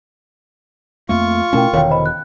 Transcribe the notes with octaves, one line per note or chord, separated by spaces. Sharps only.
F2 A3 A#3 F4 C#6
B2 A3 C#4 E4 A#4 G5
E1 D3 D#3 C#5 F5 G5
C5 D#5 B5
F#6